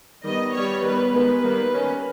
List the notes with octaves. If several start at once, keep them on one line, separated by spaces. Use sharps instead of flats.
D#3 G3 B3 D#5
G3 B3 C#5
D#3 G3 B3 B4
D#3 G#3 B3 B4
D#3 G3 A#3
D#3 A#3 C#4